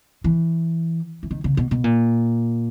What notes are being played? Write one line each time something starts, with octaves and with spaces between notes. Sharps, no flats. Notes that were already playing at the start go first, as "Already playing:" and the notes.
E3
E3
D#3
C#3
B2
B2
A#2